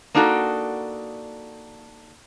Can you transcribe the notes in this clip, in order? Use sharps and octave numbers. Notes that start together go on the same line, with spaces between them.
A#3 D4 D#4 F#4 A4